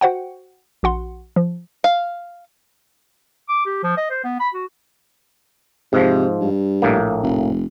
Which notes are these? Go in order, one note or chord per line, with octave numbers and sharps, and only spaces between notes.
F#4 C5 F#5 G5
A#1 F#4 F#5 C6
F3
F5
D6
G4
F3
D#5
C5
B3
B5
F#4
G#2 C3 F3
G2
A#1 A2 A#3
F1